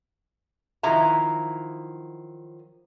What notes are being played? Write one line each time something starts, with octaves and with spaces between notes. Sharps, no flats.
D#3 F3 F#3 E4 A#5